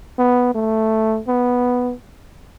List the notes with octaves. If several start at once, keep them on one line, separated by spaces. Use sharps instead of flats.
B3
A3
B3